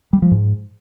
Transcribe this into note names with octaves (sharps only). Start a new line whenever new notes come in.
G3
F3
G#2